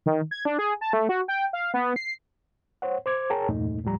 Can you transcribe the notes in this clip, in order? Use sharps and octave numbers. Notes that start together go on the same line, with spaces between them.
D#3
G#6
D4
G#4
A5
A3
F#4
G5
F5
B3
C7
C5 C#5 F#5
C5 D6 G#6
G#4 A#4 C#5 G5 A5 A#5
E2 G2 A#2 A3 D#4
D#2 A2 F3 G3 A#5